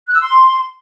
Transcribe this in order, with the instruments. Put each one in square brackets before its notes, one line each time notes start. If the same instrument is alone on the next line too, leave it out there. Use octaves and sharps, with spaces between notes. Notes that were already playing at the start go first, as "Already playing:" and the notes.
[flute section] F#6
E6
C6